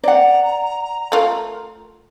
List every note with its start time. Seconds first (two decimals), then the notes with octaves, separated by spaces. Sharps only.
0.04 D5 F#5 A#5
1.12 A3 F4 A#4